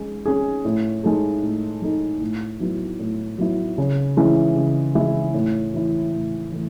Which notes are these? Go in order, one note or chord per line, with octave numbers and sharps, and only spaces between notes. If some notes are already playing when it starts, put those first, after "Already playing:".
Already playing: G#3 C#4
C#4 G#4
A2
G#3 D#4 A4
A2
G#3 D#4 A4
A2
F#3 B3 E4
A2
F#3 B3 E4
C#3
E3 G#3 C#4 E4
C#3
E3 G#3 C#4 E4
A2
E3 A3 E4
A2
E3 A3